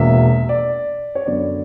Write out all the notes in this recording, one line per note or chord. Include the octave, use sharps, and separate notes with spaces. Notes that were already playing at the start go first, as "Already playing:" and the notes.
Already playing: E1 E2 B2 A#3 E5
D5
C#5
F#2 D3 F#3 B3 D5